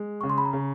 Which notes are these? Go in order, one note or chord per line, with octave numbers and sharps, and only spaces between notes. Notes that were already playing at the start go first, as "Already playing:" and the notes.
Already playing: G#3
C#3 C#6
C6
B5
A#5
C#3